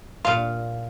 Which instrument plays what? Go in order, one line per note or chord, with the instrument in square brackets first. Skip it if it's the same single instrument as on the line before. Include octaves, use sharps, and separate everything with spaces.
[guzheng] A#2 F5 [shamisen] F4